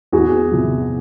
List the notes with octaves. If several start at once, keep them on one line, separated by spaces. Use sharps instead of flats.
E2 F#4 G#4
C3 F3